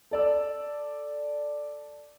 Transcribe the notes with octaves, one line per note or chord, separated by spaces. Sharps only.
A4 D5 E6